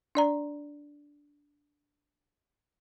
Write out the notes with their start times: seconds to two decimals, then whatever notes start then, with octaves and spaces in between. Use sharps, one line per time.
0.15 D4 D5 A#5